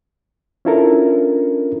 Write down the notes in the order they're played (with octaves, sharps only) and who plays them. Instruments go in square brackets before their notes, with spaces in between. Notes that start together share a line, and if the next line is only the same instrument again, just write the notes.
[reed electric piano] C#4 D4 E4 F4 A4 A#4